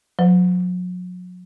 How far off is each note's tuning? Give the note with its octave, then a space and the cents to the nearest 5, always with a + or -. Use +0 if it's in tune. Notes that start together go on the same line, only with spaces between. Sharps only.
F#3 -40 B4 +45